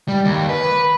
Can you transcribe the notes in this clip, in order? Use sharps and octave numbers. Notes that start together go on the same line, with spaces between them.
G3
D#2
B4